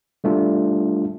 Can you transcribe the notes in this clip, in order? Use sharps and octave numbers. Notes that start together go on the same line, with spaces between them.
G3 A3 D4 F4